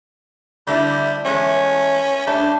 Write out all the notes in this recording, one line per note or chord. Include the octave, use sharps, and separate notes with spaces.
D3 G3 A3 E4
E2 G#3 A3 C#4
G3 A3 D4